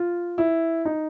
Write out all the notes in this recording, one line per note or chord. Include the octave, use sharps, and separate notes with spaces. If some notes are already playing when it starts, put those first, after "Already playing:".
Already playing: F4
E4
D#4